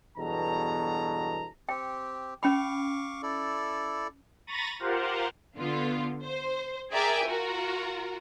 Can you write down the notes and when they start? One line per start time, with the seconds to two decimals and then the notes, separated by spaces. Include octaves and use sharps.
0.18 E2 G2 B2 F#3 A4 A#5
1.69 C4 G4 G5
2.43 C#4 F5 G5 B5 C#6 D6
3.23 E4 A4 D5
4.47 A#5 B5 C#6 A6 A#6 D#7
4.79 F4 G4 A#4 C5 F5 F#5
5.57 D3 B3 F4
6.23 C5
6.92 G#4 A#4 D5 E5 G5 G#5
7.27 F4 F#4 A#4